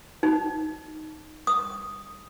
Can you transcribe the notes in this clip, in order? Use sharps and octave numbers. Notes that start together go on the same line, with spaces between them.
D#4
D#6